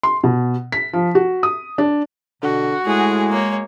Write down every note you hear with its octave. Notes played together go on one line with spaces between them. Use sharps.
C6
B2
B6
F3
F#4
D#6
D4
B2 D3 F#4
A2 G#3 G#4
A#3 C#5